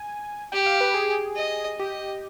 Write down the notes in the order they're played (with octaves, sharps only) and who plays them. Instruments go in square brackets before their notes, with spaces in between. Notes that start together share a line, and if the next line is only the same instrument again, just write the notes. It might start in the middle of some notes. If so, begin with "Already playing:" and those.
Already playing: [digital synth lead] G#5
[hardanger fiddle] G4 [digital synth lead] G5
[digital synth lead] F5
B4
G#4
[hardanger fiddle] D#5
[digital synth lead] G4 [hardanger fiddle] D#5